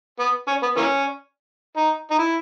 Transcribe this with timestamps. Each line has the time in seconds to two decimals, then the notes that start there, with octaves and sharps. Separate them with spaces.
0.20 B3
0.48 C#4
0.63 B3
0.77 E3 A#3 C#4
1.76 D#4
2.11 D#4
2.18 E4